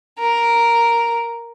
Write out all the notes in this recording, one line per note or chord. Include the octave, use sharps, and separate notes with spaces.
A#4